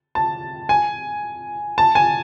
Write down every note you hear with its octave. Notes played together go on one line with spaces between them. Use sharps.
A5
G#5
A5
G#5